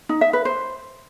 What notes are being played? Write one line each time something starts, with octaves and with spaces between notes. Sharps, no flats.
D#4
E5
B4
C5